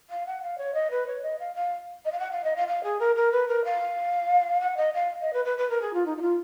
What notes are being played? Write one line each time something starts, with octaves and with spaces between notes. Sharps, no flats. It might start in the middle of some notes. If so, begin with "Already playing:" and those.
F5
F#5
F5
C#5
D#5
B4
C#5
D#5
F5
F5
D#5
F5
F#5
F5
D#5
F5
F5
G#4
A#4
A#4
B4
A#4
F5
F#5
D#5
F5
D#5
B4
B4
B4
A#4
G#4
F4
D#4
D#4
F4